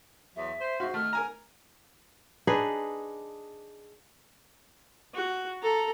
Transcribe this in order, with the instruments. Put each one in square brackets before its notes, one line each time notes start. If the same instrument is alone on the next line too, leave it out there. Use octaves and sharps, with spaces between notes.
[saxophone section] E2 F#3 [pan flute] E5
[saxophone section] C5
[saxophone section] G#2 C5 F5 [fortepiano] F#4
[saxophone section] D#3 [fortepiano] A3 [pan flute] F6
[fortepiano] A#4 G#5 A#5
[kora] D4 D#4 G#4 B4
[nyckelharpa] F#4
A4 A#5